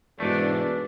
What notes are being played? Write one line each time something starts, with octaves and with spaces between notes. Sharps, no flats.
E1 G#2 A3 D4 F#4 B4